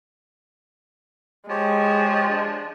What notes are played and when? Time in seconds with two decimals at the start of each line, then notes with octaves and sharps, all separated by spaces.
1.50 F3 G#3 G4 C#5
2.30 D4